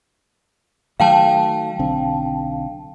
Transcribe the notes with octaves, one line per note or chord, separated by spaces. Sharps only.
D#3 F#3 A3 F5 G5 A5
B1 D3 C4